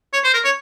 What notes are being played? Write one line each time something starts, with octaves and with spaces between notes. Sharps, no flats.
C#5
C5
A#4
C#5